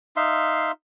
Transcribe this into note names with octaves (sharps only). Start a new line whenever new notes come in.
D#4 E5 F5 C6